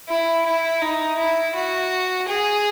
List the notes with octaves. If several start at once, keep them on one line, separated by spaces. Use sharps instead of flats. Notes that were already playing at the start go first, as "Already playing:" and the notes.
E4
E4
D#4
E4
F#4
G#4